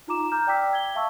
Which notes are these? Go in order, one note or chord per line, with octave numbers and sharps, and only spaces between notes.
D#4 F4 A#5 D6 E7
A#5 D6 F6 G6
D5 G5 D6 E6 B6
G#6 G7
E5 F5 A5 C#6 E6